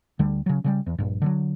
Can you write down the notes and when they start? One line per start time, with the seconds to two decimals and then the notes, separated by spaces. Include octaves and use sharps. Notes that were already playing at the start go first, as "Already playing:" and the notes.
0.19 D2 D3 G3
0.46 C#3 F#3
0.64 C#3 F3 G3
0.86 E2
0.98 A#1 G2
1.22 D3 F3 F#3